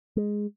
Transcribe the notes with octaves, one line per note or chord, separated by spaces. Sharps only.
G#3